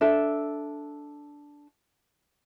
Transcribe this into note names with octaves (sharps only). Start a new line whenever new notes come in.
D4 A4 E5